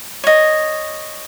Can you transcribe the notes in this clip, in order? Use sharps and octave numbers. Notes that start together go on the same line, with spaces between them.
C#5 D#5